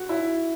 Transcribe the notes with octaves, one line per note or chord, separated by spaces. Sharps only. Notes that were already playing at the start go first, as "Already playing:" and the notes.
Already playing: F#4
E4